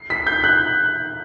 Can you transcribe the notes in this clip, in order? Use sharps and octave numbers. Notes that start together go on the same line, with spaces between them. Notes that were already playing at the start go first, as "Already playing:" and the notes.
Already playing: C7
B6
G6
F#6